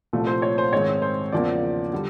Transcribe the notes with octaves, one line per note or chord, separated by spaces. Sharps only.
C2 A#2 F3 A3
C5
C#5
C5
G#2 D#3 G#3 C4 C#5
C5
E2 C#3 F3 A#3 D5
D3 G3